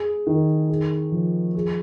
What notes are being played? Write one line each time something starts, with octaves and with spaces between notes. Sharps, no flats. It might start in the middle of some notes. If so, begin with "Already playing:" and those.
Already playing: G#4
D#3
G#4
F3
G#4